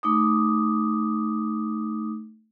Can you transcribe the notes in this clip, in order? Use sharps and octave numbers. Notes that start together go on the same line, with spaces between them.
A3 D#4 D6 D#6